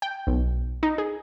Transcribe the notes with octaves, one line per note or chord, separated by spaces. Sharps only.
G5
B1
D#4
G#4